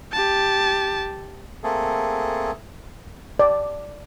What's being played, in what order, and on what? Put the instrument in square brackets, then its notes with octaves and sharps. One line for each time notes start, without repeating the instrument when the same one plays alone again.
[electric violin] G4 A5
[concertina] A3 A#3 C4 G#4 A4
[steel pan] D5